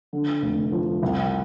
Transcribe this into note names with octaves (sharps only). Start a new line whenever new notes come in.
D3
F1
F3
C2